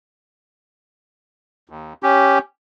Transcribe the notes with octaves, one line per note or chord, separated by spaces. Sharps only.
D#2
C#4 G4